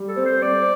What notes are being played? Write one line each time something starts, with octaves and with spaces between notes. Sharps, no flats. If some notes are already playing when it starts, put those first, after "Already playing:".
Already playing: G3
A4
C4
C5
C4 D5